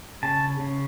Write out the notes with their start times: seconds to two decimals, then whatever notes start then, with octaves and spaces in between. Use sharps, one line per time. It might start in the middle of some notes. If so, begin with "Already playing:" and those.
0.23 C#3 A5
0.60 C#3